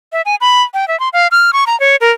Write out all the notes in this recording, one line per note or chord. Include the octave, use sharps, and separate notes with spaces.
E5
G#5
B5
G5
E5
C6
F5
F6
C#6
A#5
C#5
A#4